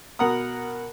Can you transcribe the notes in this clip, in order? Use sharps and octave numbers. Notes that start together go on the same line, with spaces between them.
B2 A#4 F#5 A#5 D#6